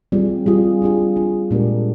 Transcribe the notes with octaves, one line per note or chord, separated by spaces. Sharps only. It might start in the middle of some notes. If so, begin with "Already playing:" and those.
G3 C4 F4 G#4
G3 C4 F4 G#4
G3 D4 F4 G#4
G3 D4 F4 G#4
A#2 G#3 D4 G4 A#4